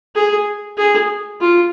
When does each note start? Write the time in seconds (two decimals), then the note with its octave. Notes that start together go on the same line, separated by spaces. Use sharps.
0.15 G#4
0.77 G#4
1.40 F4